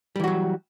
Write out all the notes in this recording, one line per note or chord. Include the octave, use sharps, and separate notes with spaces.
E3 F#3 G3 F#4